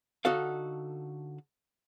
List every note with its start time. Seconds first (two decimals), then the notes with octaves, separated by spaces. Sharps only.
0.25 D3 D#4 F#4 A4 F5